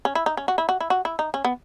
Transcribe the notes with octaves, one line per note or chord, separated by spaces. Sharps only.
C#4
E4
D#4
C#4
F#4
E4
F#4
E4
F#4
E4
D#4
C#4
B3